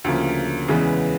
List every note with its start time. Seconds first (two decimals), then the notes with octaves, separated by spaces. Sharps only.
0.04 D2 C#3 F3 A#3
0.68 E2 C#3 E3 G#3 B3